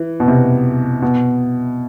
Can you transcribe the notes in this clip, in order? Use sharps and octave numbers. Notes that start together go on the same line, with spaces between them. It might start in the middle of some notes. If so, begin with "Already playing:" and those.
Already playing: E3
B2
C3
B2